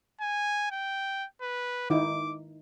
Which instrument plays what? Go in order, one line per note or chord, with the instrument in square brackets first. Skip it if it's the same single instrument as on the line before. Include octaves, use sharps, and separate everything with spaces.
[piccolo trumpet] G#5
G5
B4
[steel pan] D#3 D#4 E4 [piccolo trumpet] D6